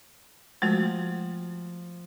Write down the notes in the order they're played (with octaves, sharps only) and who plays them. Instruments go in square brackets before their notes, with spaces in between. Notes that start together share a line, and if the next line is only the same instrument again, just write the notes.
[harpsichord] F3 [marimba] G#3 A3 F#4